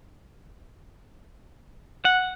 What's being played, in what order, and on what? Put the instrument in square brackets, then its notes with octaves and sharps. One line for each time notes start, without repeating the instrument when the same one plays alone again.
[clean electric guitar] F#5